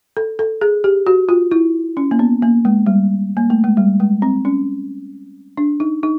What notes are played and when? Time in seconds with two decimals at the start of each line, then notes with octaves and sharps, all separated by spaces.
0.17 A4
0.39 A4
0.61 G#4
0.84 G4
1.07 F#4
1.29 F4
1.51 E4
1.97 C#4
2.11 A#3
2.19 B3
2.42 A#3
2.65 G#3
2.86 G3
3.37 A#3
3.50 A3
3.64 G#3
3.77 G3
4.00 G#3
4.22 C4
4.45 C#4
5.57 D4
5.80 D#4
6.03 D#4